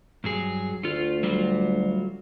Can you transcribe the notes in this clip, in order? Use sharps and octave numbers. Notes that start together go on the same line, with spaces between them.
G2 F#3 G#4
D2 A3 F4
F#3 G3 F4